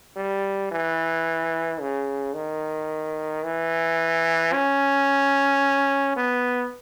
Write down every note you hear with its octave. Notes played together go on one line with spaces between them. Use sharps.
G3
E3
C#3
D#3
E3
C#4
B3